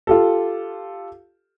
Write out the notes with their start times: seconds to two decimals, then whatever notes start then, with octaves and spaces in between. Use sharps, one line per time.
0.07 F4 G4 A4